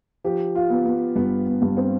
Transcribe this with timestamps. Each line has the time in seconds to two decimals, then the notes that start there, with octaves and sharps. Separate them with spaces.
0.24 F3 G4
0.55 F4
0.70 B3
0.85 B3
1.16 G2 B3
1.47 B3
1.62 G2
1.77 C4